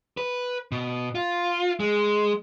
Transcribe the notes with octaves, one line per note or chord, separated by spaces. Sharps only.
B4
B2
F4
G#3